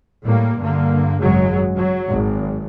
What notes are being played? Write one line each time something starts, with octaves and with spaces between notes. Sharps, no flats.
A2 G3 A#3
G2 D3 A#3
G#1 F#2 C#3 F#3 G#3
F#3
G#1